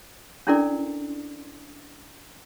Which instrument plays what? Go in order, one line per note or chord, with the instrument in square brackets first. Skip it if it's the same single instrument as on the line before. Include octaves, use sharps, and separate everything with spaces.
[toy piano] C#4 D4 E4 A4 A#4 D5